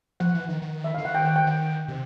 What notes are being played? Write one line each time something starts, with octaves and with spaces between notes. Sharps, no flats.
F3 F#5
E3
D#3
D#3
E5
D3 F5
D#3 F#5
G5
F#5
G5
D#3
C3